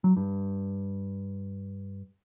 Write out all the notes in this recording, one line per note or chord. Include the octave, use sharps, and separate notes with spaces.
F#3
G2